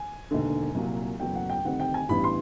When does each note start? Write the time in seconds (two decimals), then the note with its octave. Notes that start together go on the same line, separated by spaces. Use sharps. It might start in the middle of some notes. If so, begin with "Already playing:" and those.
Already playing: G#5
0.31 E1 D#2 D3
0.75 C2 A#2 F#3
1.20 F#1 E2 B2 F#3 A3 G5
1.35 F#5
1.50 G5
1.65 D2 C3 D#3 G3 C4 F#5
1.80 G5
1.94 G#5
2.09 A1 G2 E3 G3 B3 B5
2.24 C6